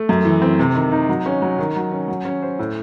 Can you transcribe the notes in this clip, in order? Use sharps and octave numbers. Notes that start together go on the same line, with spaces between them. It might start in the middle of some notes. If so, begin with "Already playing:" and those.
Already playing: A3
F#2
E3
C4
C3
D#3
D#4
F#3
C#4
F#3
D#3
F#3
C#4
F#3
C#4
C5
A2